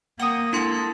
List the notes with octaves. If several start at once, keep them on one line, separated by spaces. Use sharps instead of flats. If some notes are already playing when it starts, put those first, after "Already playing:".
A#3 F#5 G5 D#6
D4 E4 A4 C6